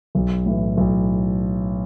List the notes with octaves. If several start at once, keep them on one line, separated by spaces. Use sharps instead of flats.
B1
A2 E3
B1